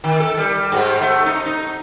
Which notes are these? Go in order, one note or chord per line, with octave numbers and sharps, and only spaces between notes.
D#3
A4
G3
G#2
A3
D#4
D#4